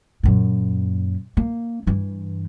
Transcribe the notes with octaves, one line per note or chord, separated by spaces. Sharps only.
F#2 A#2
A#3
G2 E3